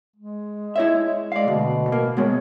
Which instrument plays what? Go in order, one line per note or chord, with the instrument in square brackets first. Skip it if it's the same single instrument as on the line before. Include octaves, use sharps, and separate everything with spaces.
[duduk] G#3
[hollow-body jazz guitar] E4 C#5 E5
[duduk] G#3 [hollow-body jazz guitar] D5 F5
[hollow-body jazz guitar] D2 [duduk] B2
[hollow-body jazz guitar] A2 A#3
[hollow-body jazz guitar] B2 G#3 [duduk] C#5